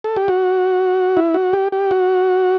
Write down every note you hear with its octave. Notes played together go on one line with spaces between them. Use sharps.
A4
G4
F#4
E4
F#4
G4
G4
F#4